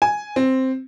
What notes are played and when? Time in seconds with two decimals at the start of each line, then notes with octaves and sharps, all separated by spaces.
0.02 G#5
0.36 C4